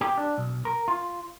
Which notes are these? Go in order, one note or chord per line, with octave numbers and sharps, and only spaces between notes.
G4
D4
B1
A#4
F4